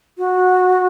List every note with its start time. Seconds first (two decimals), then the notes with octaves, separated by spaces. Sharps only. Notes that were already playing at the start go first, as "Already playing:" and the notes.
0.18 F#4